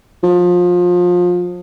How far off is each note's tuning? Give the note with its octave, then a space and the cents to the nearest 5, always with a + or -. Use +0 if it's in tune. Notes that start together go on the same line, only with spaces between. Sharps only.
F3 +25